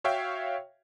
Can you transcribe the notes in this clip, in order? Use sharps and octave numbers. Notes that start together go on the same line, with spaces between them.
F#4 C#5 E5 F5 G5